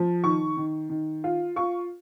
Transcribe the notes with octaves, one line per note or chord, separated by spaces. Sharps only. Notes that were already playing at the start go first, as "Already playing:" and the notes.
Already playing: F3
D#3 C#6
D#3
D#3
F4
F4 C#6